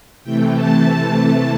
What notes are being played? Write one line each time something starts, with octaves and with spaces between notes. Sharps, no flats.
C3 E3 A3 G5
A5